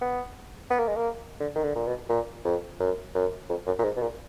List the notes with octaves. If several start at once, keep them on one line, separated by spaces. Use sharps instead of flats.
B3
B3
A#3
G#3
A#3
D3
D#3
D3
A#2
B2
A#2
F2
F#2
F#2
F2
F#2
A#2
G#2
B2
A#2